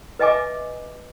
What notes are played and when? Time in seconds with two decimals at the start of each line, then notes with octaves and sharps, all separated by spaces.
0.19 B4 D#5 E5 G#5 D6